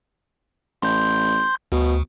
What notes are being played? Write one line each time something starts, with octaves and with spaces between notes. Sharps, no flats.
A1 C6 G6
D2 B2